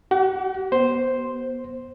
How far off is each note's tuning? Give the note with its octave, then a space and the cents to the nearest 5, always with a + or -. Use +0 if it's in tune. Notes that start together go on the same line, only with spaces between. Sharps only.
G4 -45 F#5 +0
B3 -20 C5 +0